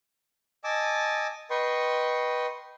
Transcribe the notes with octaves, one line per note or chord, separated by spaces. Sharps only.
D#5 G#5 A5 D6 E6
B4 D#5 G5 C6 C#6